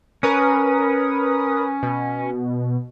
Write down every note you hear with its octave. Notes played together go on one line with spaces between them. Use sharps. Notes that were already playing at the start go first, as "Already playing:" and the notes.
C#4 A#4 B4 D#6
B2